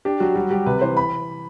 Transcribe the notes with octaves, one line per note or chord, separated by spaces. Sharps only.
D4 G4
F#3 F#4
G3 F#4
G3 G4
C3 B4
E3 C5
B5